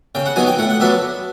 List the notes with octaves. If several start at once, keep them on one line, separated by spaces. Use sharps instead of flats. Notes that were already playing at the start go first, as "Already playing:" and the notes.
C#3 G5
F#5
F#3 B3 D#4 G#5
G5
A2 F#5
F#5
F#3 B3 D4 E5